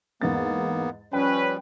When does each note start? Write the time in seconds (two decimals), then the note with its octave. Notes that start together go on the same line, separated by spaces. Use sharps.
0.22 E2 G#2 A#3 B3 A6
1.13 F3 G3 C#4 B4 G5